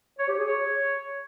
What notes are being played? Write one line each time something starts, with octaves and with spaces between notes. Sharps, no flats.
C#5
G4
G#4
C#5